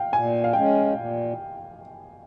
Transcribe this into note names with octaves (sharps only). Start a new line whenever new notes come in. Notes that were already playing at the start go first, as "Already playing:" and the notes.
Already playing: F5 G5
A#2 G#5
F5
G#3 C#4 G5
A#2